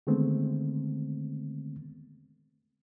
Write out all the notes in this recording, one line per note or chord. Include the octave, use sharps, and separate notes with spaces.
D3 D#3 G#3 A3 B3 C4